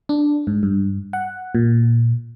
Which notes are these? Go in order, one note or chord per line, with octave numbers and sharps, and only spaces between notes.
D4
G#2
G2
F#5
A#2